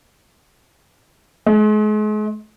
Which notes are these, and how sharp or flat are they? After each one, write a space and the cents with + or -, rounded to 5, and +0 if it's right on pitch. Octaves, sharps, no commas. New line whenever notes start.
G#3 +40